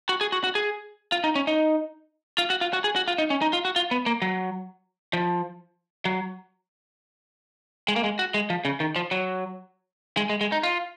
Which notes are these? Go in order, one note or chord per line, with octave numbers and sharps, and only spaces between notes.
F#4
G#4
F#4
F#4
G#4
F4
D#4
C#4
D#4
F4
F#4
F4
F#4
G#4
F#4
F4
D#4
C#4
D#4
F4
F#4
F4
B3
A#3
F#3
F3
F#3
G#3
A#3
G#3
F#4
G#3
F3
C#3
D#3
F3
F#3
G#3
G#3
G#3
D#4
F4